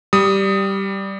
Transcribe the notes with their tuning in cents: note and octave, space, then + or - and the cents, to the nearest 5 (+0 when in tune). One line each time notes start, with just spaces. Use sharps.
G3 -5 D#6 +0